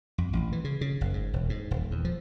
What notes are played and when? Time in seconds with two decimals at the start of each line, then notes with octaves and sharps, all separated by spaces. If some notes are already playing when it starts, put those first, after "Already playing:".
0.18 F2
0.33 A1
0.52 E3
0.64 C#3
0.81 C#3
1.01 F#1
1.14 G#2
1.33 E1
1.50 G#2
1.71 D#1
1.91 E2
2.05 F3